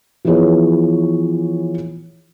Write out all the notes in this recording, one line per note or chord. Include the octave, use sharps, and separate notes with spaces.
E3 F3 B3 G#4 C#5